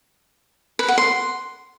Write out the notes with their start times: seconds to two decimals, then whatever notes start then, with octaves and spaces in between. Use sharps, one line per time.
0.79 B4
0.88 F#5
0.98 C6